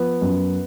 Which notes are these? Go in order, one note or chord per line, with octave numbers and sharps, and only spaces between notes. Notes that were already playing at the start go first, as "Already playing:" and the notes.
Already playing: F3 B3
F#2